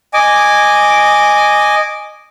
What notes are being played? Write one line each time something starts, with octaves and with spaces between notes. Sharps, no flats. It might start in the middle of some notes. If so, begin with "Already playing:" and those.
D#5 G#5 D6